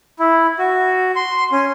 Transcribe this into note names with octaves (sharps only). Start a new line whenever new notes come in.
E4
F#4
C6
C#4